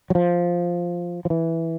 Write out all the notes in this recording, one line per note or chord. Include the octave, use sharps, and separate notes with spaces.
F#3
F3
F3
E3